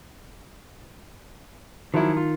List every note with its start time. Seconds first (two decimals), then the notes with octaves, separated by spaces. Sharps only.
1.94 D#3 F3 F#3 E4
2.17 F4